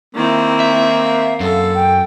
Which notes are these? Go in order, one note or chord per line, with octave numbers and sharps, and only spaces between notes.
D#3 A#3 C4 E4
E5
F5
F#2 A4
G5